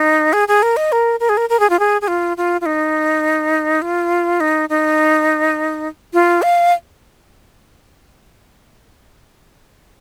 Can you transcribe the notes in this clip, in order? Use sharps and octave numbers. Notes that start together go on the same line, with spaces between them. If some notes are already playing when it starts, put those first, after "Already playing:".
Already playing: D#4
G#4
G#4
A#4
D#5
A#4
A#4
G#4
A#4
A#4
G#4
F4
G#4
G#4
F4
F4
F4
D#4
F4
D#4
D#4
F4
F5